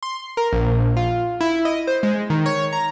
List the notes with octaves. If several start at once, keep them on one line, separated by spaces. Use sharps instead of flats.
C6
A#4
A#1
F4
E4
D#5
C5
G#3
D#3
C#5
A#5